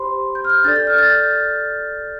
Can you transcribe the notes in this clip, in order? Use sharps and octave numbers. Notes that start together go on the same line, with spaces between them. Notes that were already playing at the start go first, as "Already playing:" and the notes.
Already playing: G4 C5 B5 C6
G6
F6
G6
D4 A4 D5 A6
G6
F6
A6
G6